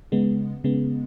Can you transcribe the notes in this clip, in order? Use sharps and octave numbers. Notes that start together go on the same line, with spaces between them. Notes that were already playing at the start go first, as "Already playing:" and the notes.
C#3 G#3 B3
C#3 G#3 B3